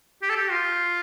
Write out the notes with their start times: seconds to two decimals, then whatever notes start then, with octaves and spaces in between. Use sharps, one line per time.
0.22 G4
0.30 A4
0.37 G4
0.51 F4